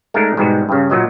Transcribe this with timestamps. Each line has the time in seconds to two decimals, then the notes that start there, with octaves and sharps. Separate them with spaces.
0.14 G#3 A3 D4 D#4 A#4
0.37 G#2 B2 G3 G#3
0.69 G2 C#3
0.90 A#2 F#3 D#5